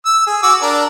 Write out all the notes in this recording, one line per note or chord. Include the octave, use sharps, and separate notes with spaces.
E6
G#4
F#4 D6 E6
D4 A#4